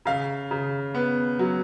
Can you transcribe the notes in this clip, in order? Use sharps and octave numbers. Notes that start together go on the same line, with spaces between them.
C#3 F5
C#3
B3
F#3